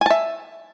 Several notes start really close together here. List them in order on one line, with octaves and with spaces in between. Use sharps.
G#5 A5 E5